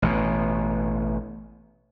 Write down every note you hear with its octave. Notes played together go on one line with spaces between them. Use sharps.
A1 B2